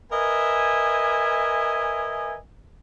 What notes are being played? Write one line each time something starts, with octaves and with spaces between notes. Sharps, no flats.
A#4 B4 D#5 E5 G#5